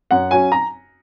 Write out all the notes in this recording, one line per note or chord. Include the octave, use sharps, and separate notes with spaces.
F#2 F#5
F#3 C#4 G#5
A#5